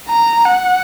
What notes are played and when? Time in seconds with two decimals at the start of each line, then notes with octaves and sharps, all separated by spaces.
0.09 A#5
0.46 F#5